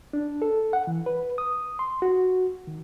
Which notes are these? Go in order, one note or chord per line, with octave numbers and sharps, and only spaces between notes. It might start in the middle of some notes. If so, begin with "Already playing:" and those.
D4
A4
F#5
E3
B4
D#6
C6
F#4
D#3